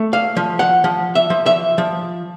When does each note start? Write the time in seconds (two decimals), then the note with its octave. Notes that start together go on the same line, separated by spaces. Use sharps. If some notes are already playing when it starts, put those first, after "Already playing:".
Already playing: A3
0.13 F5
0.37 F3
0.59 F#5
0.84 F3
1.15 E5
1.30 F3
1.46 E5
1.78 F3